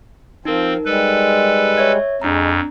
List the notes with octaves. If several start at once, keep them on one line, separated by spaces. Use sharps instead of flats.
F3 C4 D#4 F4 A#4
G3 G#3 A4 B4
C#5 E5 G#6
F2 G#3 D4 A#5